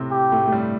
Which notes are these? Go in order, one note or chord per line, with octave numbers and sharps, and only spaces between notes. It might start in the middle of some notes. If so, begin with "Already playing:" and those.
Already playing: A2 C3 A3 C4
G4
A2 A3
A3
G2 G3